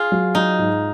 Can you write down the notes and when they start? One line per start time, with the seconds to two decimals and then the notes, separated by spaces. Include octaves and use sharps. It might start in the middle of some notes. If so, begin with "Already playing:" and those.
Already playing: F4 G#4
0.12 F#3
0.35 F#3 D#4
0.59 G#2